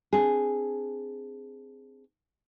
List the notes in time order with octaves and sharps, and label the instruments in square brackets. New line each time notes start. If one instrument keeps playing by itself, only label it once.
[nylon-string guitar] C4 D4 G#4